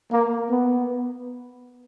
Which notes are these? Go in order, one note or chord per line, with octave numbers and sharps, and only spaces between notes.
A#3
B3